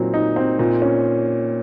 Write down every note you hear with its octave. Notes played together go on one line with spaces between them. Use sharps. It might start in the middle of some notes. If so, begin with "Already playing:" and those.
Already playing: A#2 F#3 C4 D#4
D#4
C4
A#2
C#4